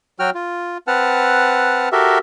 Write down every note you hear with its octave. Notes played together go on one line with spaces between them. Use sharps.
F#3 F#4 G5 F6
F4
C4 B4 F#5 A5 F6
F#4 G4 A4 A#4 E5